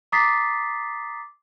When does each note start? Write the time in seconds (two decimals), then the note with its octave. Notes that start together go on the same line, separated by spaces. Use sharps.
0.12 A#5 D6 D#6 A6 B6 C7